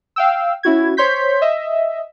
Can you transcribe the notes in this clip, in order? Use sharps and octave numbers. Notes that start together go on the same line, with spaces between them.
F5 G5 E6
C#4 E4 F#4 G#6
C5 C#5 C6 G6 B6
D#5 E5